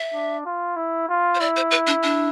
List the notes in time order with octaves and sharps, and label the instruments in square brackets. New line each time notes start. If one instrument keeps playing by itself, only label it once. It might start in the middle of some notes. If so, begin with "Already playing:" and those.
Already playing: [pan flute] E5
[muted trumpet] D4
F4
E4
F4
[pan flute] C5
[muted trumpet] E4 [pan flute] D5
[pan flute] C5
B4
D4
D4